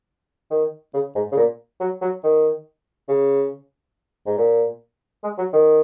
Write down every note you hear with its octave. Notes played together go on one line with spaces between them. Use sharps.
D#3
C#3
G#2
C#3
A#2
F#3
F#3
D#3
C#3
G#2
A#2
G#3
F#3
D#3